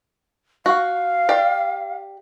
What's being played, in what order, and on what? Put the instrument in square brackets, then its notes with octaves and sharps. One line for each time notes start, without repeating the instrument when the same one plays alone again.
[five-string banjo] F#4 [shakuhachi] F5
[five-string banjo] G4 D5